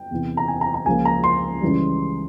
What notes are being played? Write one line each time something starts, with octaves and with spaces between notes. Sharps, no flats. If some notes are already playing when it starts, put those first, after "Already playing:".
Already playing: G5
E2 C3 E3
A#5
G#5
A#5
A#5
C#2 C#3 F3 A#3 G#5
A#5
C6
C#2 C#3 E3 G3